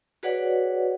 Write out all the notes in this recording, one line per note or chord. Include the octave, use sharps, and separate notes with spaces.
F#4 G#4 B4 C#5 D5 F#5